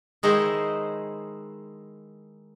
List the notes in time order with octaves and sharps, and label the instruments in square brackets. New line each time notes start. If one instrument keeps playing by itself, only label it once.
[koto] D#3 G#3 D#4 E4 C5